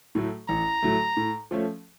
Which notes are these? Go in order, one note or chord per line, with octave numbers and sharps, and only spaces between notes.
A2 F#3 A3
A1 A#5
A2 F#3 A3
A2
F3 A3 C#4